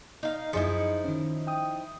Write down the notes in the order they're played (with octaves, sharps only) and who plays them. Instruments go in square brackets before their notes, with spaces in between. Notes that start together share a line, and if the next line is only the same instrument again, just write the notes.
[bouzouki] D#4 F5
[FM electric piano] F#2 G#4 C#7 [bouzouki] F3 D#4 E4
[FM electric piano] D#3 C#4
G5 D#6